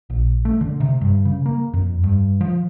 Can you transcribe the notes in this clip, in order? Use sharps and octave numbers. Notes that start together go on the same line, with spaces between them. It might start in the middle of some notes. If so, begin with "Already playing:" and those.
A#1
A3
D3
C3
G2
C#3
A#3
F2
G2
F3